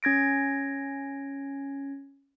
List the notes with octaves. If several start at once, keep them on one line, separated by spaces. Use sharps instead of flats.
C#4 G#6 A#6 D7